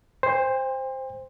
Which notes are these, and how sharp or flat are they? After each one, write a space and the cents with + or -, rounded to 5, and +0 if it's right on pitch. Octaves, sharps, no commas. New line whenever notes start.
C5 +0 G5 +40